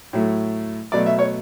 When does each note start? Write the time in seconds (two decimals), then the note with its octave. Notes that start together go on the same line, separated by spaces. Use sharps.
0.13 A2 F#3 A3
0.92 B2 F#3 A3 D5
1.06 E5
1.19 C#5